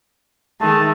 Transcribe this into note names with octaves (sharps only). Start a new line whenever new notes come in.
D#3 G#3 A3 A5